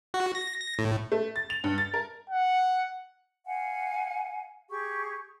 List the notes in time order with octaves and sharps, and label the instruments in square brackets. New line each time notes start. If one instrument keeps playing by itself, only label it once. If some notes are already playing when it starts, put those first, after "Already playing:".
[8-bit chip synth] F#4
A#6
A#6
A2
[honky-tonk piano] A3
A6
F7
G2
A6
A#4
[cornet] F#5
[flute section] F5 F#5 G#5
G4 G#4 C#6